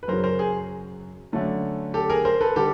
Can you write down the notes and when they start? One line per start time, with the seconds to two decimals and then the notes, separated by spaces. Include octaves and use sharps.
0.03 B4
0.08 F#2 C#3 F#3 A#4 C5
0.24 A#4 C5
0.39 G#4
1.32 D3 F#3 A3 C#4
1.94 G4 A4
2.10 G#4 A#4
2.25 A#4 C5
2.41 A4 B4
2.56 D3 G3 G4 A4